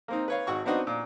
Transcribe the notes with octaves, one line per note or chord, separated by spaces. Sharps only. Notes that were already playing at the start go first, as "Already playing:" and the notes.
A#3 C4 D#4
B4 C#5 F5
G#1 F#4 C#6
B3 C4 D4 D#4 F#4 D#5
A#2